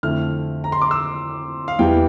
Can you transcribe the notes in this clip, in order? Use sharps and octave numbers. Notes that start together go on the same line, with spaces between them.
F2 D3 A3 E4 F6
A#5
C6
D6
E6
F5
E2 E3 G3 G5